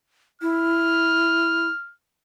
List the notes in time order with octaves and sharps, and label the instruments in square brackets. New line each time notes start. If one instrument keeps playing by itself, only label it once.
[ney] E4 [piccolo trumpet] F6